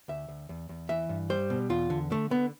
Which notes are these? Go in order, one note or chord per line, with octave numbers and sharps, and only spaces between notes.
D2 E5
D2
E2
E2
E3 E5
G2
G3 C5
B2
E2 F4
D3
D3 A3
D3 B3